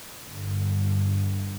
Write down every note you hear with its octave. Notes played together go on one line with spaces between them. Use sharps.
G1 G2 D3